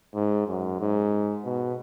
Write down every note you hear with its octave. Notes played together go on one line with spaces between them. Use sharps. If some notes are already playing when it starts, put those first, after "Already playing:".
G#2
F#2
G#2
B2